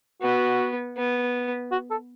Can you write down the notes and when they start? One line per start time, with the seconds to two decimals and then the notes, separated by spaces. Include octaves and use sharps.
0.22 B3 F#4
0.98 B3
1.72 F#4
1.91 A4